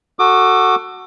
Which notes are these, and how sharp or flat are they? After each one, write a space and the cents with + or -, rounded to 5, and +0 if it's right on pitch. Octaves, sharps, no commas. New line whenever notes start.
F#4 +0 A4 +15 D6 +30